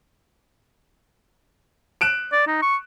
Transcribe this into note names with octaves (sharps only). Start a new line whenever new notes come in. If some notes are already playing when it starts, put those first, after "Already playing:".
F#6 D7 E7
D5
D#4
C#6